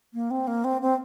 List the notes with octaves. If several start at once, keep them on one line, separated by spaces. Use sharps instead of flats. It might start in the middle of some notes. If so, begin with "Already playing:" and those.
A#3
C4
A#3
C4
C4